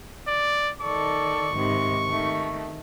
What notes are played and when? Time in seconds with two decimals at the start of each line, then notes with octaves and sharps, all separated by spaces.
0.27 D5
0.81 D#3 A4 D5 C#6
1.56 G#2 C3 D#3
2.07 D#3 A3